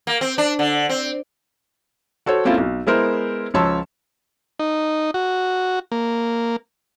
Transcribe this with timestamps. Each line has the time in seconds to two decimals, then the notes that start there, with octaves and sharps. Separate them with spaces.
0.07 A#3
0.21 C4
0.38 D4
0.59 D3
0.89 C4
2.26 F#4 A4 C5 C#5
2.45 A#3 C4 C#4 E4 F4 A4
2.58 B1
2.87 G#3 B3 E4 A#4 C5
3.54 C#2 F3 C#5 A5 C6 E6
4.59 D#4
5.14 F#4
5.92 A#3